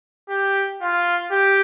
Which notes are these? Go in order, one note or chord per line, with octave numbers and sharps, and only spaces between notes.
G4
F4
G4